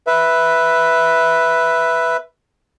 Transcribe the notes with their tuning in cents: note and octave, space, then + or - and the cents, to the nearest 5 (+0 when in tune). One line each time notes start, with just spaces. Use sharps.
B4 +0 E5 +0